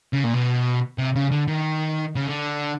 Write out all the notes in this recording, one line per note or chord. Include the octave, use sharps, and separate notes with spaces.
C#3
A#2
B2
C3
C#3
D3
D#3
C#3
D3